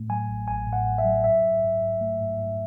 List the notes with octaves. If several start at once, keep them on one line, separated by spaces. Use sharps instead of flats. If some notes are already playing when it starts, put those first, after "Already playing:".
Already playing: A2 A3
F#3 G#5
A1
A1 G#5
A2
F#5
A1
E5
F#3
G#2 E5
G#2
G#2
G#2
A3
G#2
G#2